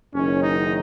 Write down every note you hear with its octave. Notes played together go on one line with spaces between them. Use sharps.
F#1 F#2 D#3 C#4
D#4